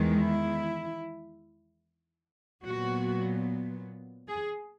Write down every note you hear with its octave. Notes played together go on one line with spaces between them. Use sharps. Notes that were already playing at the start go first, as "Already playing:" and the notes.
Already playing: E2 D#3 G#3
E4
A#2 F#3 B3 F#4
G#4